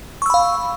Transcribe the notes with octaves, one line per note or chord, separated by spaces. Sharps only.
F5 B5 C#6 E6